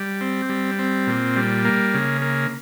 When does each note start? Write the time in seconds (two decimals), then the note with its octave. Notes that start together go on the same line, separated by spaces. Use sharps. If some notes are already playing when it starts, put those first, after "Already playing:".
Already playing: G3
0.21 C4
0.49 G3
0.79 C4
1.07 A#2
1.36 G3
1.65 A#3
1.94 C#3
2.22 A#3